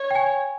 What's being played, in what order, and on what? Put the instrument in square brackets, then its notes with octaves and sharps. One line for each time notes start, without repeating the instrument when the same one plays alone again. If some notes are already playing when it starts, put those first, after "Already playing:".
Already playing: [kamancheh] C#5
[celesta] G5
G#5